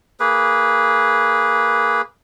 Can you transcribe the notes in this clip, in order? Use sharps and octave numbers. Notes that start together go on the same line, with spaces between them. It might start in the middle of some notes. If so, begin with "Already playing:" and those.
A#3 G#4 B4